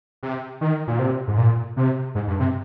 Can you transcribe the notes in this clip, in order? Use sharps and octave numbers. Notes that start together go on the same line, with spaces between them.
C3
D#3
A#2
C3
G#2
A#2
C3
G#2
G2
C3